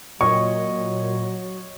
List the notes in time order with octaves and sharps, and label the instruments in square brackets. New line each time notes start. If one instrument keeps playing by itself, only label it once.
[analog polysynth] A#2 [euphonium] F#3 [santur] C#5 D#5 [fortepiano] C#6